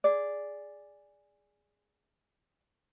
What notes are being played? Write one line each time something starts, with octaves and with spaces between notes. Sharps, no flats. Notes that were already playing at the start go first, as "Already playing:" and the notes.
G#4 D5